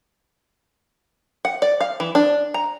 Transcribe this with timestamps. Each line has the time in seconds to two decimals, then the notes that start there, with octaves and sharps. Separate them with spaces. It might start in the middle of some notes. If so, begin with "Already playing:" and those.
1.45 F#5
1.62 D5
1.81 F5
2.00 E3
2.15 D4
2.54 A#5